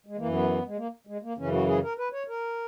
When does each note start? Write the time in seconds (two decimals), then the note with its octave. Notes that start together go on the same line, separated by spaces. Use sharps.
0.07 G#3
0.17 F#2 E3 A#3
0.32 B3
0.66 G#3
0.77 A#3
1.07 G#3
1.23 A#3
1.37 F#2 C#3 E3 C#4
1.53 F#4
1.67 G#4
1.83 A#4
1.98 B4
2.13 C#5
2.28 A#4